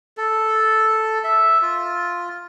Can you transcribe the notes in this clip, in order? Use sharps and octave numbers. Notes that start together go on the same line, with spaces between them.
A4
E5
F4